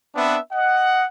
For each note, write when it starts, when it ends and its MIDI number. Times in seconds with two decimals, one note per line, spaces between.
0.16 0.38 59
0.16 0.38 60
0.16 0.38 62
0.16 0.38 71
0.16 0.38 76
0.52 1.04 75
0.52 1.04 78